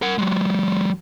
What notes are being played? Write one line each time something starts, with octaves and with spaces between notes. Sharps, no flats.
A#4 F#5
F#3 G#3